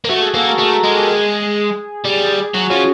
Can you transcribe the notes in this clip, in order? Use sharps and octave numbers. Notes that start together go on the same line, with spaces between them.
A#3
A3 F#4
G#4
A#3 A4
A#4
A3 A#4
G#3 A#4
G4
G#4
G3
F#3 F#4
F3 C#4